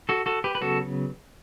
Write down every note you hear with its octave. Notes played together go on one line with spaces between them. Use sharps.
F#4 A4
F#4 A4
G4 B4
B4
C#3 F#3 B3 F#4 A4